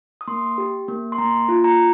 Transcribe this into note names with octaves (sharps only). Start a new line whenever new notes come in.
D#6
A#3 C6
G4
A#3
C6
A#3 A#5
F4
A#5